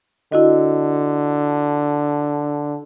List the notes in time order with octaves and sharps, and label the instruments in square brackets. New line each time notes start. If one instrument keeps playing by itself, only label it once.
[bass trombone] D3 [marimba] E4 F#4 D#5